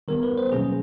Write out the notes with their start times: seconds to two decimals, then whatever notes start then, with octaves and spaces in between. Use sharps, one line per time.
0.08 D#3 G3 B3 A#4
0.23 B4
0.38 C5
0.52 B2 F#3 A#3 C#4 G#4